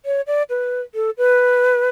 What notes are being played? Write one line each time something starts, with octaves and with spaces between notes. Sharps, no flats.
C#5
D5
B4
A4
B4